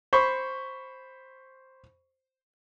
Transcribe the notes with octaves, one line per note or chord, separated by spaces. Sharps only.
C5 B5 C#6